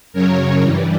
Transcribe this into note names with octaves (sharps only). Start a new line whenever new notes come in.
F#2 C#3 F#3 A#4 C#5
G2 E3 G3